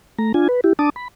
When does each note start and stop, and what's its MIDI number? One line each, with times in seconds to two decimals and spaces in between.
0.19 0.32 57
0.19 0.32 82
0.34 0.48 62
0.34 0.48 65
0.34 0.48 80
0.49 0.61 71
0.64 0.73 64
0.64 0.73 67
0.79 0.90 62
0.79 0.90 81
0.79 0.90 86
0.79 0.90 87
0.96 1.08 83